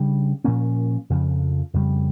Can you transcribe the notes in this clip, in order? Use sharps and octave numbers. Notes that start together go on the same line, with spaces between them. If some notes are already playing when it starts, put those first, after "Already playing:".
Already playing: C#3 G3 D4
A#2 F3 A#3 C#4
F2 C#3 F3
F2 C#3 G3